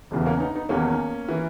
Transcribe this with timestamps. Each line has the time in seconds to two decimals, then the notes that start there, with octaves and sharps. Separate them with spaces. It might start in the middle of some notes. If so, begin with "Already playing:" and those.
0.11 E1 E2 C#3 E3
0.26 A#3 C#4
0.40 B3 D#4
0.55 B3 D#4
0.69 E1 E2 D#3 A#3 C#4
1.29 E3